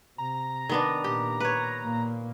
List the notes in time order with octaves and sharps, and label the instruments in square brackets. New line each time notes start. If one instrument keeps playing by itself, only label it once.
[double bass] C3 [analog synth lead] A#5
[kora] D#3 B3 D4
[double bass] A#2 [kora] G4
[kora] B4 C#5
[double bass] A#2 A#3